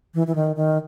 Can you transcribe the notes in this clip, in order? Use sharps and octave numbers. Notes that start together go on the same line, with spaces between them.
E3
E3
D#3
D#3